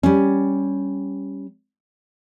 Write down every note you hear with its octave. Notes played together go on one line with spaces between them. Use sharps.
G3 C#4